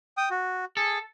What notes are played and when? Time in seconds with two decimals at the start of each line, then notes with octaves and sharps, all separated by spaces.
0.17 G5 D#6
0.31 F#4
0.77 G#4 A4